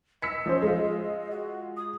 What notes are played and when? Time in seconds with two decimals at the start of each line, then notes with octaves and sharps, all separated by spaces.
0.22 D#5 E6 B6 C#7
0.46 F3 C#4 C5
0.62 G#3 F4
1.31 F#4
1.77 D#6